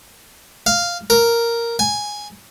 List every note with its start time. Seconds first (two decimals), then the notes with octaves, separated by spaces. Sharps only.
0.66 F5
1.10 A#4
1.79 G#5